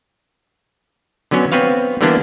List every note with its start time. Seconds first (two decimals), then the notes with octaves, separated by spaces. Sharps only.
1.31 D3 F#3 B3 C#4
1.52 B3 C4 B4 C#5 F5
2.01 D3 E3 G3 A#3 B3 D4